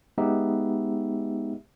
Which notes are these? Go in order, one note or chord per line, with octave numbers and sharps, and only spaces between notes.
G#3 B3 D#4 G4 E5